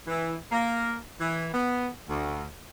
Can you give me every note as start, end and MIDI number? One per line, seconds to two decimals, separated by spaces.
0.07 0.35 52
0.52 0.96 58
1.20 1.47 52
1.54 1.87 59
2.09 2.46 38